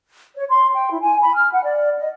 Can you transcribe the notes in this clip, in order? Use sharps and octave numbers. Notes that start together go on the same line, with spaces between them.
C#5
C6
G5
E4
G#5
B5
F6
F#5
D5
D#5